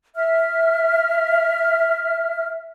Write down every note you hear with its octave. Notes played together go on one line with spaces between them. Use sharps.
E5 F6